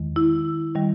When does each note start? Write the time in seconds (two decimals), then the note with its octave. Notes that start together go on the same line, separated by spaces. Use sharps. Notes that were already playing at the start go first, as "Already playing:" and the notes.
Already playing: E2 D#3 G#3
0.16 E4
0.75 D#3 G3